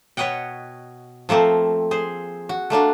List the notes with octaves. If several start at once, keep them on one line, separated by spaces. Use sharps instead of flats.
B2 B4 C#5 D#5 F#5 G5
F3 A3 A#3 C4
G#4 C5
F#4
A3 A#3 D4 F#4